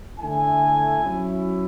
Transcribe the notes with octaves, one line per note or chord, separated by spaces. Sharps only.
D3 A3 E4 G#5
F#3 C#4 E4